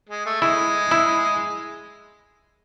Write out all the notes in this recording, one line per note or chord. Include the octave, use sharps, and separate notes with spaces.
G#3
A3
G#3 E4
E4